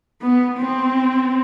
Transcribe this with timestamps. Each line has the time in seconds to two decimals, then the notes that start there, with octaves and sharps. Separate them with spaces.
0.22 B3
0.59 C4